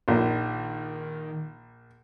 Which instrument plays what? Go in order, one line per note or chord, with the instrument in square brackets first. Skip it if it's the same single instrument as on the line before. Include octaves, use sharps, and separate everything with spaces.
[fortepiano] A#1 [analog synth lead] D#3